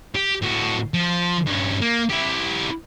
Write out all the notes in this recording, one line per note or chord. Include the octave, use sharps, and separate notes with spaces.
G4
A2 F#4
F3
G2 C#4
A#3
E4 G4